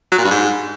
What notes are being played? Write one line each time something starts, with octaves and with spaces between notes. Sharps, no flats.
F#3
A#2
G2
G#2